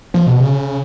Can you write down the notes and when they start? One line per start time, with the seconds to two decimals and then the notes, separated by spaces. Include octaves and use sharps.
0.14 F3
0.27 B2
0.40 C#3